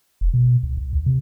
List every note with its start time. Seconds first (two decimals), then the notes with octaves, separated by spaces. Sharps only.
0.21 F1
0.34 B2
0.63 C#2
0.77 C2
0.93 D2
1.06 C3